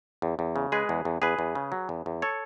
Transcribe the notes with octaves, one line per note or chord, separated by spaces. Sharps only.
E2
E2
C#3
G#3 G#4 B4
E2
E2
E2 G#4 B4
E2
C#3
F#3
E2
E2
A4 C#5